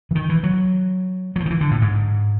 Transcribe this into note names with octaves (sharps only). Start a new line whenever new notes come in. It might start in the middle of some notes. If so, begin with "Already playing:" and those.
E3
D#3
E3
F#3
F#3
F3
D#3
E3
D3
A2
G#2